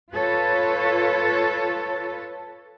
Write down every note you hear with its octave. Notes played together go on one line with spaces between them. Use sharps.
F4 A4 B4 C#5